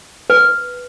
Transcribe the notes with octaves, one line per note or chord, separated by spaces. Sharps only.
B4